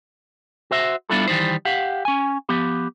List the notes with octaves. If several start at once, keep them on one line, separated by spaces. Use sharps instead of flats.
F#4 C5 E5
G3 B3 D4 E4 F4 A4
D#3 E3 G3 D#4 C5
G4 F5 F#5
C#4 G#5
F3 B3 G4